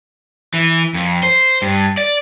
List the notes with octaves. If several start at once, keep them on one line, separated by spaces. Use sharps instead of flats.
E3
F2
C5
G2
D5